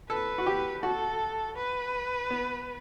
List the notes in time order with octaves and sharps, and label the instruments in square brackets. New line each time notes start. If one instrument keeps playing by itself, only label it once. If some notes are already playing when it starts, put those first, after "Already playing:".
[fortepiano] A4 [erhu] B4
[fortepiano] F#4
G4
[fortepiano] F#4 [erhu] A4
[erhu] B4
[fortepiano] B3